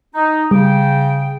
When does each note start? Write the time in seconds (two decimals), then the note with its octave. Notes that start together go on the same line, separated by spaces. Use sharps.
0.14 D#4
0.51 C#3 G3 G5